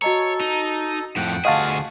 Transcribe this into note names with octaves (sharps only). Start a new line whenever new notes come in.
F#4 A4 C#5 D#5 A#5
D#4
F2 A2 F#5 G5
D2 F4 F#4 G#4 D#5 F5 F#5 A5